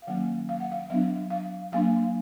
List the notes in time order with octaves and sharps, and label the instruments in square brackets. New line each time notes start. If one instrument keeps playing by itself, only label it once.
[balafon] F5
D#3 F#3 A#3 C#4 F#5
F5
F#5
F5
F#3 B3 D4 E5
F5
F#3 A#3 D4 F5